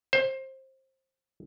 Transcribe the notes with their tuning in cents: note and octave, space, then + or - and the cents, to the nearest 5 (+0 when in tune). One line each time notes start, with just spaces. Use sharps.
C5 +20